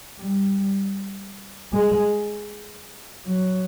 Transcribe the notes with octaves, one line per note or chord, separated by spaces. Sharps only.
G3
G#3
F#3